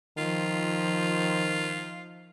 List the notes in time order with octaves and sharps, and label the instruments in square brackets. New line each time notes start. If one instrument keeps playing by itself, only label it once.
[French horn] D#3 [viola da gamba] F3 [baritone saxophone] F4